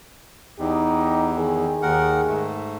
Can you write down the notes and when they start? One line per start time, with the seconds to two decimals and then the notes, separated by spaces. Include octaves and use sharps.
0.59 E2 D#4 G4
1.37 D#3 G4 G#4
1.82 D#2 A#4 F#5
2.28 G#2 A3